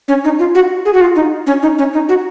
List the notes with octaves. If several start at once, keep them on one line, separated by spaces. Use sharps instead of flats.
C#4
D#4
F4
F#4
G#4
F#4
F4
D#4
C#4
D#4
C#4
D#4
F#4